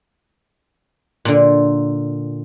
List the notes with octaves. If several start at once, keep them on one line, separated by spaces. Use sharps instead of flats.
A#2 D3